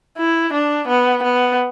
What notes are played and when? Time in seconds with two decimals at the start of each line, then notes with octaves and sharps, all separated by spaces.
0.17 E4
0.53 D4
0.88 B3
1.23 B3